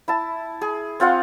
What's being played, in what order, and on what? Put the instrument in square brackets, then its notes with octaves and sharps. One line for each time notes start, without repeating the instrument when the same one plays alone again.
[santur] E4 A5
G#4
C4 F4 F5 F#5